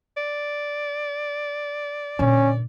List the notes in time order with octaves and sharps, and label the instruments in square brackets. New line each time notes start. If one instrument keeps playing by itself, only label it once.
[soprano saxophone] D5
[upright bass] A#2 D3 [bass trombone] C#4